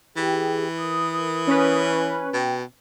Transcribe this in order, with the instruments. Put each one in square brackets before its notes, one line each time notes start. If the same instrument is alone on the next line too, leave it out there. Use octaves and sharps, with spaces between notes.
[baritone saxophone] E3 [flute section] G4 G#4 G5
[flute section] A#4 D#6
[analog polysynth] C#4 B4
[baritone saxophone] B2 [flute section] G5